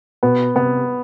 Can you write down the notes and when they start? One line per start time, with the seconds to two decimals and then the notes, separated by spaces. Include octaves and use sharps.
0.23 B2 B3
0.56 C3 B3